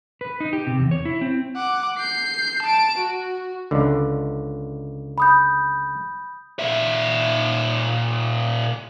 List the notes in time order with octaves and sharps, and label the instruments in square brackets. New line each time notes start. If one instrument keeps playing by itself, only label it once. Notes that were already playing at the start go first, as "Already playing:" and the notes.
[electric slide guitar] B4
D#4
G4
C3
E2
C#5
E4
C4
[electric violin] F#5 D6
G6 C7
A5 D7
F#4
[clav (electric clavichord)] C#2 D3
[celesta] B5 D#6 G6
[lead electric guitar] A#2 E5